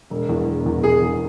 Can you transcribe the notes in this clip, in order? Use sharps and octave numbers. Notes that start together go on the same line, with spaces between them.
E1
E2
E1
E2
E1 G#4
E2